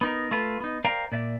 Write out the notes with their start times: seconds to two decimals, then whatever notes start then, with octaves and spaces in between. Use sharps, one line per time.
0.01 B3 D#4 A#4
0.31 A3 F4 B4
0.60 B3 D#4
0.84 A#4 C5 D5 F5 G5 A#5
1.12 A#2 D5 E5